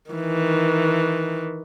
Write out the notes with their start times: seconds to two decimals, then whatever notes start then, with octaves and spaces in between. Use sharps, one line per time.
0.11 D#3 E3